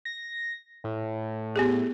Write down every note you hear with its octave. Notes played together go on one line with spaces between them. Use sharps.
A#6
A2
B3 G4 G#4